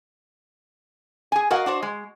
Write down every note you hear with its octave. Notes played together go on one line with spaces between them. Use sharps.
G#4 G#5
F#4 A#4 D#5 F5 F#5
D4 F#4 C5
G#3